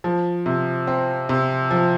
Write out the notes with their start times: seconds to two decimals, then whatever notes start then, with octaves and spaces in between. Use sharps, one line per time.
0.04 F3
0.46 C3
0.87 C4
1.29 C3
1.71 F3